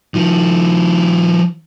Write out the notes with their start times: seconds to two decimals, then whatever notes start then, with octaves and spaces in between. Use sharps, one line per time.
0.14 D#3 F3